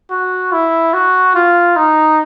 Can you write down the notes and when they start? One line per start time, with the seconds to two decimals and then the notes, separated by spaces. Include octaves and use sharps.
0.11 F#4
0.53 E4
0.94 F#4
1.35 F4
1.76 D#4